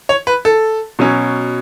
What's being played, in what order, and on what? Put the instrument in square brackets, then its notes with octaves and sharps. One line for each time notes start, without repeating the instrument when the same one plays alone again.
[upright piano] C#5
B4
A4
B2 F#3 C#4